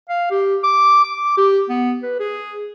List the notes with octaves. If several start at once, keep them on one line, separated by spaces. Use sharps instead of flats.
F5
G4
D6
D6
G4
B3
B4
G#4